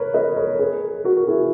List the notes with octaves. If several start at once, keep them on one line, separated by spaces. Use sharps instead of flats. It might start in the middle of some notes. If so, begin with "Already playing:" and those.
Already playing: A#4 B4 C#5
B4 D#5
A#4 C#5
G#4 B4
F#4 A#4
F#4 A#4
E4 G#4